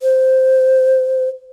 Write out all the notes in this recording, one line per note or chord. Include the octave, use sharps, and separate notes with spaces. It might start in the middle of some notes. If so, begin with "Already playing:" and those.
C5